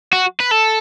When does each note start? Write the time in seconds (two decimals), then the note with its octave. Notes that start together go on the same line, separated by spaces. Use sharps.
0.13 F#4
0.40 B4
0.51 A4